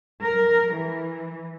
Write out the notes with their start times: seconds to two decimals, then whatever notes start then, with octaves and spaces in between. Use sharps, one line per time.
0.23 A#4
0.73 E3